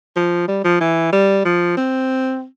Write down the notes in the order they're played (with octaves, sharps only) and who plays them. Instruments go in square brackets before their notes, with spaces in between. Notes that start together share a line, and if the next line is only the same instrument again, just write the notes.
[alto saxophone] F3
G3
F3
E3
G3
F3
C4